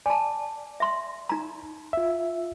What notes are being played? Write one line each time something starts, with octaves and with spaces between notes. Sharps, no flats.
D5 G#5 A5
E5 C6
D#4 A#5
F4 E5